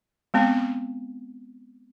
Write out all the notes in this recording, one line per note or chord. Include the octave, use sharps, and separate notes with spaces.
G#3 B3 C4